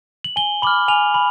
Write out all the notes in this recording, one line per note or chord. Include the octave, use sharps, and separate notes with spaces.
F#7
G#5 G7
B5 D6 F6 F#7
G#5 F7
B5